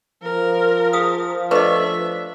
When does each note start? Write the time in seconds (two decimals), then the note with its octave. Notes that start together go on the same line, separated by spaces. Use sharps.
0.23 F3 A#4
0.93 G#4 F5 D#6
1.51 A3 D4 B4 D#5 E5